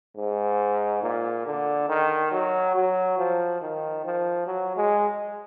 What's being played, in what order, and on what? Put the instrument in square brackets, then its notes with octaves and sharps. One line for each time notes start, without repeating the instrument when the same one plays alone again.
[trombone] G#2
A#2
D3
D#3
F#3
F#3
F3
D#3
F3
F#3
G#3